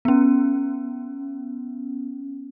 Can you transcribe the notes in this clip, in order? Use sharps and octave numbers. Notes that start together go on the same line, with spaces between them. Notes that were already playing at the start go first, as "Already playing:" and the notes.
B3 C#4